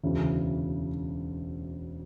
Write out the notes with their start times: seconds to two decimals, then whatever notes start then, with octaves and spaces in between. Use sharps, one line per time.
0.03 E1 D2 C#3 E3